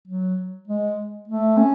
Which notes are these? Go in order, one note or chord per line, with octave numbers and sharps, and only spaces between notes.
F#3
G#3
A3
C#4